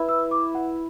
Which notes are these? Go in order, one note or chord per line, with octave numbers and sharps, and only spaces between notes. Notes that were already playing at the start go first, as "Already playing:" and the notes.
Already playing: E4 B4 E5
E6
D6
F#5